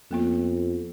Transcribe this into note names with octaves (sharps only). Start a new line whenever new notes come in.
F2 A#3 B3 F4